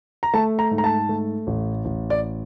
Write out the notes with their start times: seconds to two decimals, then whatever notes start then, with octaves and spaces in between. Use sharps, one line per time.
0.23 A#5
0.34 A3 A5
0.59 A#5
0.71 G#2
0.78 A#5
0.84 A5
1.09 A3
1.47 A1
1.85 A1
2.10 D5